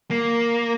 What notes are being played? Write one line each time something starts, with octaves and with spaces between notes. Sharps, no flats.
A#3